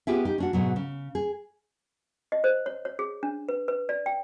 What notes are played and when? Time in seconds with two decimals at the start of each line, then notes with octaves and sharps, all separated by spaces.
0.07 B3 F4 G4 G#4 E5
0.25 D#4 G4
0.38 C#4 D4 F#4
0.53 G#2 B2 F#3
0.76 C#3
1.15 G#4
2.32 D#5
2.44 C5
2.66 C#5
2.85 C#5
2.99 G#4
3.23 D4
3.49 B4
3.68 B4
3.89 D5
4.06 G5